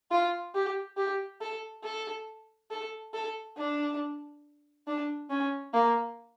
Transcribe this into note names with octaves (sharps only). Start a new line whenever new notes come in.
F4
G4
G4
A4
A4
A4
A4
D4
D4
C#4
A#3